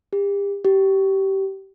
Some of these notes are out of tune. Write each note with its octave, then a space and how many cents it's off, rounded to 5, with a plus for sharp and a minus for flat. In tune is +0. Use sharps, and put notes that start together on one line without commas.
G4 +40
G4 -20